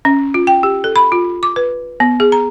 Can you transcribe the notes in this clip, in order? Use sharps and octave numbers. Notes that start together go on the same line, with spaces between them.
C#4
F4
G5
G4
A4
B5
F4
D6
B4
B3
G#4
A#5